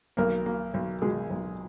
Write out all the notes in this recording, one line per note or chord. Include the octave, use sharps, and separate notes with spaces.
B1 A#3 A#4
A#3
B1
B2 G#3 G#4
B1